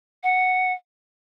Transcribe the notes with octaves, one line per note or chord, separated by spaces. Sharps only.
F#5